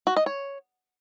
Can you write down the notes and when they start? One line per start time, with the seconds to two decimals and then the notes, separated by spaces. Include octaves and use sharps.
0.07 F#4
0.16 D#5
0.26 C#5